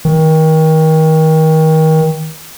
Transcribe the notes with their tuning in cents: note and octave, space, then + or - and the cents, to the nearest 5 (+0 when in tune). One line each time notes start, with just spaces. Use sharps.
D#3 +30